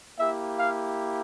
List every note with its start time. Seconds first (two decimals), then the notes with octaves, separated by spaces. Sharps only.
0.19 A#3 E4 G4 E5
0.59 F5